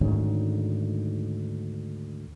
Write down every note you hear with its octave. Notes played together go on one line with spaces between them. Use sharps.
D2 G#2 D#3 C#4